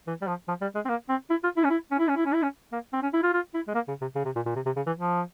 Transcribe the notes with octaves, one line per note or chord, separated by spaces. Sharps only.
E3
G3
F3
F3
G3
G#3
C4
A#3
C4
E4
F4
E4
C#4
E4
C#4
E4
C#4
E4
C#4
E4
C#4
A#3
C4
C#4
E4
F4
F4
E4
G#3
A#3
C#3
C3
C#3
C3
A#2
A#2
C3
C3
C#3
E3
F3